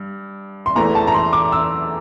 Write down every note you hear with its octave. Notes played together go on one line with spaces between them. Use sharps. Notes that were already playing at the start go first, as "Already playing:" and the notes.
Already playing: G2
C6
E2 E3 A3 A#5
A5
A#5
C6
D6
E6